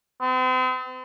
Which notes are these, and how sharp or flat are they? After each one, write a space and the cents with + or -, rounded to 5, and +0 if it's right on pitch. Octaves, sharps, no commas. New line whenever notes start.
C4 -40